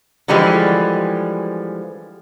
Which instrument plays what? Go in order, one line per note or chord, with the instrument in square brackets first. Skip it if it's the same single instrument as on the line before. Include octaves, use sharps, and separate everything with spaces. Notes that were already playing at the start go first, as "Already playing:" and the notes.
[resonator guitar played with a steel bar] D3 E3 F3 G3 G#3